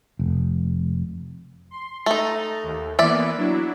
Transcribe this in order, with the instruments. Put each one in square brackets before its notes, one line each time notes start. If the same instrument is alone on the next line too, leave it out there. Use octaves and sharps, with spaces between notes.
[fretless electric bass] F1
[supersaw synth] C6
[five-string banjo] A3 D#4 [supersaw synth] A#5 A6
[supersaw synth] D#2
[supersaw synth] E3 A#3 B3 [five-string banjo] D5 E5
[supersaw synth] F#3 D4 E4